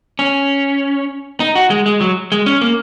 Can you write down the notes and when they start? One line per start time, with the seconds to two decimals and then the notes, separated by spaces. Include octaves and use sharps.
0.19 C#4
1.40 D#4
1.55 F#4
1.70 G#3
1.86 G#3
2.01 F#3
2.32 G#3
2.46 C#4
2.61 A#3